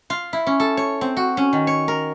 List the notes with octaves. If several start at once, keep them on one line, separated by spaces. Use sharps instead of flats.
F4
E4
C#4
A4
C#5
C4
F#4
C#4
D#3
C#5
A#4